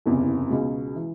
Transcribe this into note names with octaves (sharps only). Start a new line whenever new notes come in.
F#1 E2 C3
C#2 B2 G#3
E3